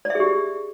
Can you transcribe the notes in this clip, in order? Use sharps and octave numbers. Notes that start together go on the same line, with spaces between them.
D5
E5
G#4
G4